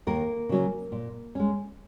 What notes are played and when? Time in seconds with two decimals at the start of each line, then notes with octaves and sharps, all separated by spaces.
0.07 D#2 A#3 A#4
0.49 C#3 F#3 C#4
0.92 A#2
1.35 G#3 C#4